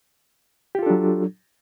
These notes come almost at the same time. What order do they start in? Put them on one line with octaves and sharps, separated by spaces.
G4 F4 A4 D4 F#3